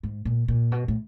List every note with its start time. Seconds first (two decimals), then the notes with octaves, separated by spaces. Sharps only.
0.03 G#2
0.25 A#2
0.48 A#2
0.72 B2
0.88 A2